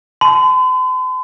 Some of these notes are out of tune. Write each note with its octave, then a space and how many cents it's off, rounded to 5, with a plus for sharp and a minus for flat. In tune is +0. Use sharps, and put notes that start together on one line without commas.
A5 -30 C6 -45